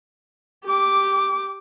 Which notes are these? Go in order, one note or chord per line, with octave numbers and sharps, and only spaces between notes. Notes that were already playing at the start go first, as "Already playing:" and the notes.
G4 D6